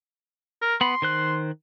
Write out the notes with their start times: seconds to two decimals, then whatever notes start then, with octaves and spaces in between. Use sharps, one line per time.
0.62 A#4
0.81 B3 B5 C6
1.02 D#3 C5 F#6